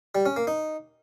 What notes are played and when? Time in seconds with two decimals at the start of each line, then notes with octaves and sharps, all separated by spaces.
0.15 G3
0.26 C#4
0.36 A#3
0.47 D#4